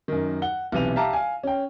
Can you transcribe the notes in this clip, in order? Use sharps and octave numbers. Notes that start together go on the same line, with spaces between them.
F#2 D#3
F#5 G7
B1 C3 E3 D#7 F7
G4 E5 F5 A5 A#5
F5 G#5
C#4 G5